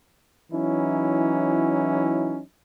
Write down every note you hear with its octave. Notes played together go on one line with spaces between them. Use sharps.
E3 F#3 C#4 D#4 E4